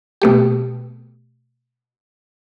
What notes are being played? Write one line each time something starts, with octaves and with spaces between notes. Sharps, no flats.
B2 A3 G4